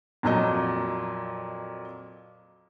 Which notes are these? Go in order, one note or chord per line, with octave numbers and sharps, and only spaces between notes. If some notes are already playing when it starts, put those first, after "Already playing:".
F2 A#2 F#3 D#5